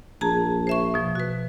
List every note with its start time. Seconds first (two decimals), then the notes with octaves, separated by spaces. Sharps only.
0.21 A#1 G#4 A5 A#5
0.67 C5 E5 C#6
0.94 B2 F3
1.15 F#4 B4